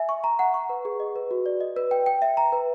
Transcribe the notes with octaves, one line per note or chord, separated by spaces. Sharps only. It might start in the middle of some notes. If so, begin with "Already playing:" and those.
Already playing: E5 G#5
C#6
A#5
F#5
C#6
B4
G#4
D#5
B4
F#4
D5
D#5
B4
G5
G5
E5
A#5
B4